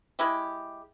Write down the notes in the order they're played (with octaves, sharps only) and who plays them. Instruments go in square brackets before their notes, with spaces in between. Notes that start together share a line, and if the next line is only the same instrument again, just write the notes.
[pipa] G#3 E4 G4